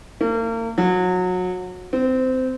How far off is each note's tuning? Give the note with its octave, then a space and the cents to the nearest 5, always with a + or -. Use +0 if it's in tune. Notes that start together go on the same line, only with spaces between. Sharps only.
A#3 -40
F#3 -25
C4 -20